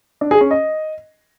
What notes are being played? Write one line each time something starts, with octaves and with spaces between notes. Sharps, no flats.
D4
G#4
C#4
D#5